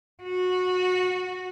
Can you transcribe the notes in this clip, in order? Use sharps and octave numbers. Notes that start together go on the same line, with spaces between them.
F#4